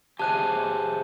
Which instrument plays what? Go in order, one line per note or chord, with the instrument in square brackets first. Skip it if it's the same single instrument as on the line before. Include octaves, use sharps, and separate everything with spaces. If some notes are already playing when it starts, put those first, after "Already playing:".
[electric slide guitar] G4 G#4 C5 [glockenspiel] A5 F#6 D#7